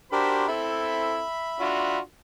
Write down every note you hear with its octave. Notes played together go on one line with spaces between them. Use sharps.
D4 F#4 G4 A#4 C5 B5
C4 E4 A4 E5 B5
D4 F4 F#4